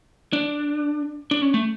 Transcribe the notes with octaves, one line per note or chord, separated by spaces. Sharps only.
D4
D4
C#4
A3